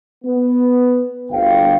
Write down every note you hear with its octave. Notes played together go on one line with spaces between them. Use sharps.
B3
G1 D2 F5 G5